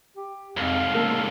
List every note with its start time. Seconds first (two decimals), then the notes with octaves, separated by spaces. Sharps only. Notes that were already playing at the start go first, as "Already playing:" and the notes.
0.16 G4
0.57 C2 F2 G#2 F5
0.95 C#3 G#3 A#3 A4